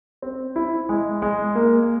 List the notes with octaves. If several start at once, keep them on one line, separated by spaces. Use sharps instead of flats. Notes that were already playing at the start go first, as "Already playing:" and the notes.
C4
E4
G#3
G#3
A#3